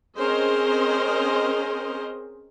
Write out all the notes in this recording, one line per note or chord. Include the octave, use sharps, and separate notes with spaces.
C4 C#4 G#4 A#4 C5 D#5